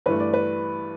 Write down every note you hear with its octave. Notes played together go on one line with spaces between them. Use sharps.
G2 E3 A3 B4
D5
B4